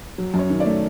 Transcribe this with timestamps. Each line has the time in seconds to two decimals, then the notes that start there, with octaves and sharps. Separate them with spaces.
0.18 F#3
0.34 F#2
0.39 C#5
0.50 D#3
0.60 D5
0.66 A3